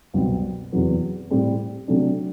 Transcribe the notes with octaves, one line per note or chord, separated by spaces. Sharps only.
C2 B2 F#3 C4
E2 C3 F#3 B3
A2 G3 C4 G4
C3 F#3 A3 D4